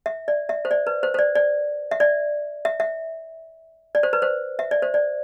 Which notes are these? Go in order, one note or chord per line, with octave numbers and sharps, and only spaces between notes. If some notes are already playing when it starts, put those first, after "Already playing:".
E5
D5
E5
C5
D5
B4
C5
C5
D5
D5
E5
D5
E5
E5
D5
C5
B4
C5
E5
D5
C5
D5